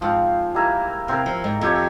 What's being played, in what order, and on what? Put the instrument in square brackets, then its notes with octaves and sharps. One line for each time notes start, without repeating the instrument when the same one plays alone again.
[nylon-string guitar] G#2 [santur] F3 C4 F4
[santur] G3 A#3 E4 A#4
[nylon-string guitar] C3 [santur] C4 E4 A#4
[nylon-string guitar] F3
G#2
[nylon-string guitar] F2 [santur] E4 G4 C#5